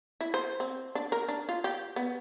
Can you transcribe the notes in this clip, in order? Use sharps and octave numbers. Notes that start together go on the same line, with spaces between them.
E4
C5
C4
D4
A#4
D4
F4
G4
B3